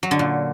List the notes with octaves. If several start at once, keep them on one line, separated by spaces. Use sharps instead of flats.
F#3
D3
A#2